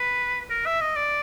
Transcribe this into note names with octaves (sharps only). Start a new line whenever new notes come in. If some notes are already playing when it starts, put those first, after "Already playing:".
Already playing: B4
A#4
E5
D#5
D5